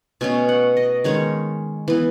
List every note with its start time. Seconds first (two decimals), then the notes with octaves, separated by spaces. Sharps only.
0.21 B2 A3 C#4 G#5
0.49 F#5
0.77 D#5
1.04 D#3 G#3 C#4 C#5
1.88 E3 B3